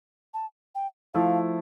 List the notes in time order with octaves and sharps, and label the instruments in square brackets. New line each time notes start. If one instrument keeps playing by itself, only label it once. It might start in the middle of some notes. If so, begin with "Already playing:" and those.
[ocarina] A5
G5
[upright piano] F3 A3 E4 [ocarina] F5